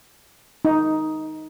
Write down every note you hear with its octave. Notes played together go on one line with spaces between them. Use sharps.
D#4